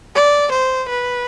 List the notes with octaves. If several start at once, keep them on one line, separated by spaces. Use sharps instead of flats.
D5
C5
B4